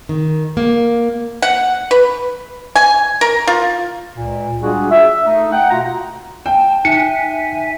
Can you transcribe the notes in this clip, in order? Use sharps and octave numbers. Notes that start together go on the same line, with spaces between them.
D#3
A#3
F#5
B4
G#5
A#4
F4
C#2 A#2
G3 G#3 D4 F4 F#4 G#4
E5
A3 D#4
F#5 G5
B2 A3 F4 F#4 A#5
G5 A5
D#4 E5 G#5 C#7